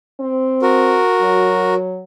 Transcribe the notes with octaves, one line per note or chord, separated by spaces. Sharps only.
C4
F#4 A#4
F#3